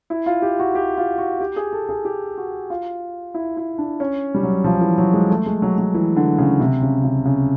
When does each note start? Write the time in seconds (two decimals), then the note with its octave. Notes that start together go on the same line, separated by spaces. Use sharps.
0.10 E4
0.26 F4
0.42 G4
0.59 F#4
0.75 G4
0.97 F4
1.18 F#4
1.40 G4
1.56 G#4
1.73 A4
1.89 G#4
2.05 G4
2.37 F#4
2.70 F4
3.34 E4
3.57 E4
3.78 D4
4.00 C#4
4.35 G3
4.43 F#3
4.64 F3
4.81 E3
4.98 F#3
5.14 G#3
5.30 A3
5.46 G#3
5.62 F#3
5.78 F#3
5.94 E3
6.16 D3
6.38 C#3
6.60 C3
6.82 C#3
7.04 C#3
7.25 C#3